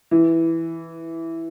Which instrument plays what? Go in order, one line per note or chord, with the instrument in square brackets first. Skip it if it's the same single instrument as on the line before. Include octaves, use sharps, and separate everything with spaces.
[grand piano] E3